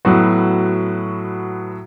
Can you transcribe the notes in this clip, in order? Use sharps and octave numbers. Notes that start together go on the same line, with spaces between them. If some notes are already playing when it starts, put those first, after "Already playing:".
A2 F#3 B3 F#4